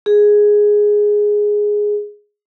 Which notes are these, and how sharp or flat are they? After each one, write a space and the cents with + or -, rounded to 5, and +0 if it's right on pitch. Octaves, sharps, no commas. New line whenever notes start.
G#4 +0